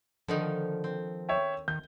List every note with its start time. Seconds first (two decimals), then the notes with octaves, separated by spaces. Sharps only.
0.28 D3 D#3 F3 D#4
0.84 C4
1.29 C#5 E5 G5
1.68 D#3 G6